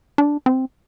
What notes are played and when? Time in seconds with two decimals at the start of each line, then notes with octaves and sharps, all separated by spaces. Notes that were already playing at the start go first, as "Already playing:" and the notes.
0.18 D4
0.46 C4